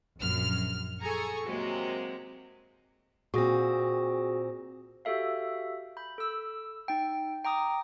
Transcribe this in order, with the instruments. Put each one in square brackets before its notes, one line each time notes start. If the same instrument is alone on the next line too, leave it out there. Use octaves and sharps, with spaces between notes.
[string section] A#1 F#2 F6
G#4 A4 G#5 A#5 C#6
C3 F#3 G#3 A#3
[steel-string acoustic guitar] A#2 C4 [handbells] F#4 G#4 A#6
[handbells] F#4 G4 A4 E5 F5
B5 G6
A4 E6
D#4 G5
G5 A#5 D6 D#6